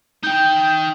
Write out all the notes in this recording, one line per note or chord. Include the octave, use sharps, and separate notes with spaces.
D#4 G5 G6